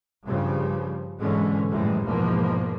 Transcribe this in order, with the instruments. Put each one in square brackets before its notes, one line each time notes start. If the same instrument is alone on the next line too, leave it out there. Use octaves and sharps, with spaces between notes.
[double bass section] G2 C#3 F3 G3
G#2 B2 D3 E3 G#3 C#4
F#2 A2 E3 F3 G3 G#3
E2 G#2 B2 E3 F3 A#3